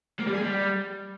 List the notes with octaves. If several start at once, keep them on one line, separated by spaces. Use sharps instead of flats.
A#3
G3
G#4
G3